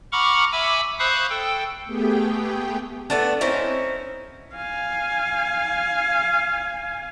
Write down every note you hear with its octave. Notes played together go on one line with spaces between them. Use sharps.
F#5 A#5 B5 C#6 D6 F6
E5 G#5 B5 D6 E6
C5 F5 B5 C#6 D#6 F#6
A4 G5
A3 B3 G4 G#4 G5
A3 B3 D4
C4 C#4 D#4 E4
F5 G#5